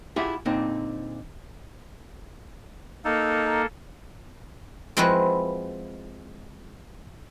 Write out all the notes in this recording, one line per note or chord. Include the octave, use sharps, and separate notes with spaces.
E4 F4 G4 G#4 E5 F#5
A#2 D3 C4 D#4
A#3 D#4 A4
F3 G#3 C4 E4 F#4 B4